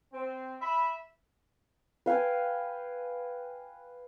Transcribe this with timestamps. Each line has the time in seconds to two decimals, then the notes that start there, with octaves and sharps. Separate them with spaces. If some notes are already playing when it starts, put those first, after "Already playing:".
0.13 C4
0.61 E5 B5
2.06 B4 F5 G5 G#5